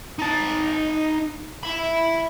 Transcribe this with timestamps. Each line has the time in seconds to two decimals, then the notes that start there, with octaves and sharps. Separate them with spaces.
0.19 D#4 A5
1.63 E5 B5